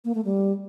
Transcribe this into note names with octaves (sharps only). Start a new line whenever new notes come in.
A#3
A3
G3